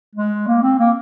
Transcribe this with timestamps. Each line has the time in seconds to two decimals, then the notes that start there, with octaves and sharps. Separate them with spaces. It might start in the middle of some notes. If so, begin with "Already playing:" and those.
0.15 G#3
0.47 A#3
0.62 C4
0.79 A#3